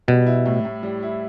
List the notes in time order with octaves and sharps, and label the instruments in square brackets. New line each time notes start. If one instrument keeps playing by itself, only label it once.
[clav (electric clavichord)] B2 [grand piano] G3
[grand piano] E4
A2
A2
G3
E4